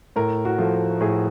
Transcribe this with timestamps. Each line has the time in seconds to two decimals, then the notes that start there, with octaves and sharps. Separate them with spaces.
0.16 A2 A#4
0.45 F#4
0.58 F3 A3
1.00 A2 G#4